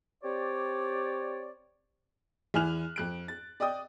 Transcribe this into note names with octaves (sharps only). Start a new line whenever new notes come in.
C4 G4 C#5 D5
E2 E4 G#5 F6 F#6 F7
F2 F#6 D7
A6
D5 D#5 G5 D#6